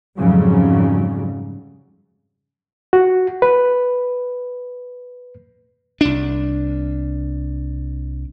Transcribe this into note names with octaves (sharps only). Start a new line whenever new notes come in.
F2 G#2 C#3 F#3 G3
F#4
B4
C2 D4